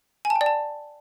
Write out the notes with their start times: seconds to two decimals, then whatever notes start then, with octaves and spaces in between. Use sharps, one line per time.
0.25 G#5
0.30 A5
0.36 G5
0.41 D5
0.46 A5